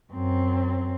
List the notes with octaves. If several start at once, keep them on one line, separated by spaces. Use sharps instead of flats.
F#2 C4